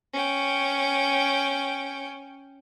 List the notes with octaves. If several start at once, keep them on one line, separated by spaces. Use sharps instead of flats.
C#4 G5